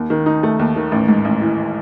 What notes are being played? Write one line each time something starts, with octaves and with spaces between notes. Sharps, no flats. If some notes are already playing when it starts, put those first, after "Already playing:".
Already playing: D#2
D#3
D#4
A3
D#2
D#3
A1
G#2
A1
E3